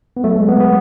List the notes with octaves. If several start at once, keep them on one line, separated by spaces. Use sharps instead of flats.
B3
F#3 A3
G#3
F#3 B3
B3